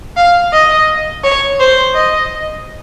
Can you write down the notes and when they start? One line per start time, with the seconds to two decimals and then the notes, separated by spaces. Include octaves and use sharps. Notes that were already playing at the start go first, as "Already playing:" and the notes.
0.17 F5
0.53 D#5
1.24 C#5
1.60 C5
1.94 D#5